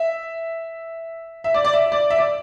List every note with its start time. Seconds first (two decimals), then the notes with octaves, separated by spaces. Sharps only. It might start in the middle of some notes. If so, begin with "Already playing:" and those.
Already playing: E5
1.44 E5
1.54 D5
1.65 D5
1.73 E5
1.92 D5
2.10 E5
2.18 D5